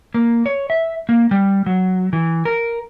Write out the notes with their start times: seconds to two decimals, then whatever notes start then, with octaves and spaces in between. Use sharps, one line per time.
0.14 A#3
0.46 C#5
0.70 E5
1.09 A#3
1.31 G3
1.66 F#3
2.13 E3
2.45 A#4